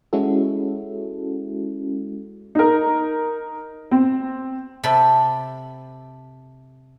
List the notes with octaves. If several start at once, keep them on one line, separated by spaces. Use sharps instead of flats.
G#3 C#4 E4 F#4 A4
D#4 A#4
C4
C3 A4 B5